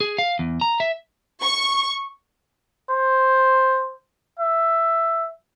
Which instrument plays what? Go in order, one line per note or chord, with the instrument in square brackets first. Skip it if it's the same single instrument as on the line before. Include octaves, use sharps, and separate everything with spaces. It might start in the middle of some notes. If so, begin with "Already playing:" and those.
[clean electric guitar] G#4
F5
E2
A#5
E5
[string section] C#6
[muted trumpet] C5
E5